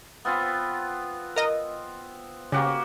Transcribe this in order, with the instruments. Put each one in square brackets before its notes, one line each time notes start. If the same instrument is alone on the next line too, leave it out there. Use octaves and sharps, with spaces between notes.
[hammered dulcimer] B3 C4 F4
[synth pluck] A#4 D#5
[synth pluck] C#3 [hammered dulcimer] A#3 F#4 G4